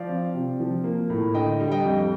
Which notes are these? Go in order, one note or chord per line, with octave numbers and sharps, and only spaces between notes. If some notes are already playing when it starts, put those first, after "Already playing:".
Already playing: F3 D5 F5
C4
C3
F3
A#3
A2
D3 D#5 G5
G3
D#5 G5
F2